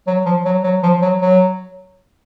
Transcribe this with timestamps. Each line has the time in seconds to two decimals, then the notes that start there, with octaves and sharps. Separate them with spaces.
0.07 F#3
0.26 F3
0.45 F#3
0.64 F#3
0.83 F3
1.02 F#3
1.22 F#3